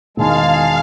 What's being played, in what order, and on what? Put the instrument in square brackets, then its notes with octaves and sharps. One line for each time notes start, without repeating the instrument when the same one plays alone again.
[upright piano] E1 D#3 G#5 [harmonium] G#3 [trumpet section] G#4 A5 [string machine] F5